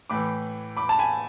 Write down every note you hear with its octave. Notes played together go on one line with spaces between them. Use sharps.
A2 E3 B5 D6
B5 D6
A5
G#5 B5